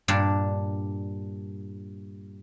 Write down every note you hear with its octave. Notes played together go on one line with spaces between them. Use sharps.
G2 A#2 D4 D5